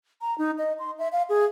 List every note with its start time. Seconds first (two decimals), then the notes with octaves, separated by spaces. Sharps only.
0.21 A#5
0.38 D#4
0.58 D#5
0.79 C6
0.99 E5
1.12 F5
1.29 G#4